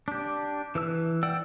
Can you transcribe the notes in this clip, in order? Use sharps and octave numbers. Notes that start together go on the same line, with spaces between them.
D4 G4
E3 B4 E6
D5 F#5 G5 E6